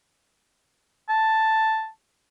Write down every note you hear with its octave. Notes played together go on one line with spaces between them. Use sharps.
A5